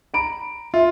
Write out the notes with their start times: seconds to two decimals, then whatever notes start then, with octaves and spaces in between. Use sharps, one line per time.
0.14 A#5 B5 D7
0.74 F4 E5